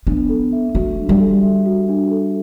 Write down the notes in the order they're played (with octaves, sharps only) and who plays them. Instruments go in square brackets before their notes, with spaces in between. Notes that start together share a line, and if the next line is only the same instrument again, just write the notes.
[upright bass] B3 [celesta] D4
[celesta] A4
E5
[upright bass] A3 [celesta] F#4
[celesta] D4
[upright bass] G3
[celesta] A4
E5
F#4
D4
A4